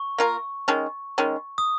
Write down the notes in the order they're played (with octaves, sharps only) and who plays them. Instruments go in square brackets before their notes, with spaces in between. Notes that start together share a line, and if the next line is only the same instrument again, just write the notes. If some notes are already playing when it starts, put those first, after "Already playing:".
Already playing: [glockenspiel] C#6
[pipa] A#3 F4 A#4
D#3 G#3 C#4
D#3 G#3 C#4
[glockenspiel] D#6